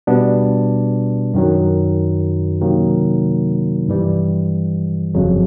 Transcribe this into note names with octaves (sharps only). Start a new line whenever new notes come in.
B2 G3 B3 D4
F#2 D#3 F#3
C3 D#3 F#3 A#3
G2 E3 G3
G1 F2 C#3 F#3